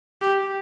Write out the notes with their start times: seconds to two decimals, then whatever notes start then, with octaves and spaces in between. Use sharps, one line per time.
0.22 G4